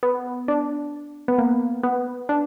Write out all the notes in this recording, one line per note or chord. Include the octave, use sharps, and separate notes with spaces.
B3
D4
B3
A#3
B3
D4